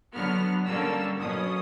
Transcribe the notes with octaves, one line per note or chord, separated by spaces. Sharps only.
D3 F#3 B3 F6
D3 G3 A#3 C#4 E6
B2 F#3 A#3 C#4 D#6